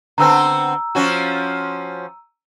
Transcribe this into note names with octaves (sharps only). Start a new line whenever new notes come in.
D3 B3 C4 A#5 E6
F3 C#4 F#4